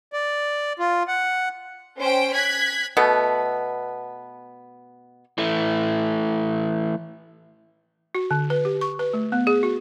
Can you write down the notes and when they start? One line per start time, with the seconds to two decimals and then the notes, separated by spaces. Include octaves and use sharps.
0.13 D5
0.79 F4
1.08 F#5
1.99 C#4 C5 G5 D7
2.34 F#6 G#6 B6
2.97 B2 A3 B3
5.38 E3 A3
8.15 F#4
8.31 D3
8.50 B4
8.65 G4
8.81 C#6
8.99 B4
9.14 A3
9.32 B3
9.47 G#4
9.63 F#4